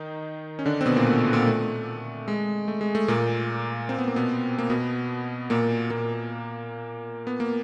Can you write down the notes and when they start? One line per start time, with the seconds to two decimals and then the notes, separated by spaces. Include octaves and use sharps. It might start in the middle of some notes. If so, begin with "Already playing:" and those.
Already playing: D#3 D#4
0.59 C#4
0.66 D3 D4
0.81 C4
0.86 B2 B3
0.96 A#2 A#3
1.06 A3
1.33 A#2 A#3
1.47 A3
2.28 G#3
2.68 A3
2.81 G#3
2.95 A3
3.08 A#2 A#3
3.89 C4
3.98 B3
4.08 A#3
4.16 B2 B3
4.58 A#3
4.70 B2 B3
5.50 A#2 A#3
5.90 A#2 A#3
7.27 B3
7.40 A#3